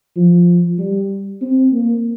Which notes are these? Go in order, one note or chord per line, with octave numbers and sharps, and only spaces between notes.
F3
G3
C4
A#3